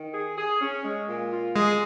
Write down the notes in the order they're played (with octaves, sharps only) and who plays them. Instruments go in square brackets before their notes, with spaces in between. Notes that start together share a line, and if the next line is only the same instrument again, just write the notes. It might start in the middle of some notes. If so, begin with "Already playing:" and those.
Already playing: [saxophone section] D#3
G#4
G#4
C#4
G#3
A#2
F4
[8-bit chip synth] G#3 [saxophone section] G#4